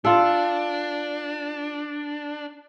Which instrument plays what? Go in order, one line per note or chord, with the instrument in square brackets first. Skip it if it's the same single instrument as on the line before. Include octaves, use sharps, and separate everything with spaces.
[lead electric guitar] D4 [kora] F4 A4